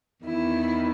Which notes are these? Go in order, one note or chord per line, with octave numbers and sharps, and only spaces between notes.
E2 D#3 E4